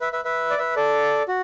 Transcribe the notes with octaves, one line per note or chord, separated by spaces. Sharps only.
B4 E5
B4 E5
B4 E5
D5
B4 E5
A4 D5
F#4